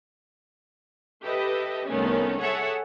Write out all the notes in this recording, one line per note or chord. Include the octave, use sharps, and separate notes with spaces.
G4 A4 B4 D#5 E5
C2 D#3 A3 B3 C#4
G#4 A4 C#5 E5 F#5